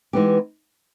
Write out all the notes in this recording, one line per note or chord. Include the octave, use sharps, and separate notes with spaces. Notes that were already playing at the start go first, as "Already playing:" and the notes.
E3 G#3 B3 D#4 G4